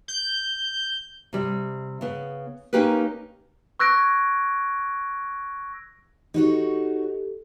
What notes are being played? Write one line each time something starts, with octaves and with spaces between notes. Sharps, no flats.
G6
C3 G3
C#3 B3
A#3 C#4 D#4 G4 A#4 B4
C#6 E6 F#6 G#6 A#6 D7
D#4 F#4 G4 A4 C#5